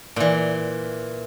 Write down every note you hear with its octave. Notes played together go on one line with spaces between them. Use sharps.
A#2 E3